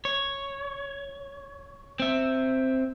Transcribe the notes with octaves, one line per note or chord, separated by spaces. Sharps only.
C#5
C4 E5